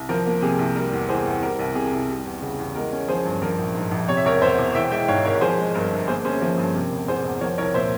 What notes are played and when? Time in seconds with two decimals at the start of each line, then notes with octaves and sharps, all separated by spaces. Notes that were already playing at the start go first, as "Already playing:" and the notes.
Already playing: C2
0.09 F3 A#4
0.26 A#3
0.42 C3 G#4
0.59 C2
0.76 G3 A#4
0.92 E2
1.09 E3 G#4 C5
1.26 E2
1.42 G3 A#4
1.59 C2
1.75 C3 G#4
1.93 C2
2.09 G3
2.25 E2
2.42 C#3
2.58 E2
2.75 G#3 A#4
2.92 C#4
3.08 F3 G#4 C5
3.25 G2
3.42 F3 A#4
3.59 A#1
3.75 G#2
3.91 A#1
4.08 C3 C#5
4.17 E5
4.25 E1 A#4 C#5
4.41 E2 C5 E5
4.58 E1
4.75 E3 E5 G5
4.91 G#3 E5 G5
5.08 G#2 C#5 F5
5.25 G#1 A#4 C#5
5.41 F3 G#4 C5
5.58 G#3
5.74 G2 A#4
5.91 G1
6.08 A#3 G#4 C5
6.25 C#4 G#4 C5
6.41 F3 A#4
6.58 G2 G#4
6.75 C3 A#4
6.92 E1
7.08 E2 G#4 C5
7.24 E1
7.41 F3 A#4 C#5
7.58 C2 A#4 C#5
7.74 A#2 C5 E5